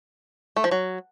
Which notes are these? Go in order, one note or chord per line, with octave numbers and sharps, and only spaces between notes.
A3
F3
F#3